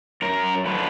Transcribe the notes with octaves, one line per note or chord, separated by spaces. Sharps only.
F#2 A#4
D3 F3 B4